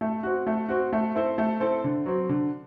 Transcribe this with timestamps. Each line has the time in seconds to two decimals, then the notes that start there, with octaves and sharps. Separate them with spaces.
0.01 A3
0.23 C4 F#4
0.47 A3
0.69 C4 F#4
0.93 A3
1.15 C4 E4 A4 C5
1.38 A3
1.60 C4 E4 A4 C5
1.84 D3
2.06 F#3 C4
2.29 D3